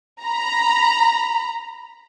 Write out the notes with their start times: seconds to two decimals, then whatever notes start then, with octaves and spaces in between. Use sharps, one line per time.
0.23 A#5 B5